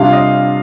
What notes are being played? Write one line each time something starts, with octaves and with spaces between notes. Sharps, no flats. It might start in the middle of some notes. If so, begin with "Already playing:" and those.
Already playing: C3 G3 D4 F4 F5
D#5